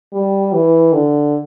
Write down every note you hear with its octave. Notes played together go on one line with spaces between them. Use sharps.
G3
E3
D3